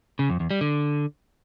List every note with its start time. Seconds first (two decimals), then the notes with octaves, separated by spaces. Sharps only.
0.19 C#3
0.30 F2
0.40 E2
0.51 G3
0.61 D3